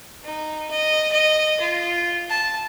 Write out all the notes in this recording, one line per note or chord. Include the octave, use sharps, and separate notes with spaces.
D#4
D#5
D#5
F4
A5